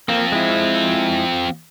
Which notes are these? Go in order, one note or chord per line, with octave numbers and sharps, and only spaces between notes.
F3 A#3 C4
G#3 E4